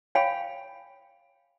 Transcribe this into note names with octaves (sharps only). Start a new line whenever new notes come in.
C#5 F5 G5 G#5 B5